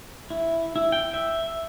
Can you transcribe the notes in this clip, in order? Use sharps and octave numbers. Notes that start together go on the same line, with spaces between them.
E4
E4
G5
E5